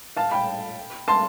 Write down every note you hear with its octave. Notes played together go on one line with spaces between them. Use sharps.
F5 A5
G5 B5
A5 C6